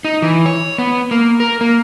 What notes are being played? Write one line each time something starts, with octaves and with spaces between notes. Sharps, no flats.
D#4
E3
C#5
B3
A#3
A#4
A#3